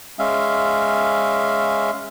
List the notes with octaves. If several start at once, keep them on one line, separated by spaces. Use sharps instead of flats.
G#3 C#4 E5 F5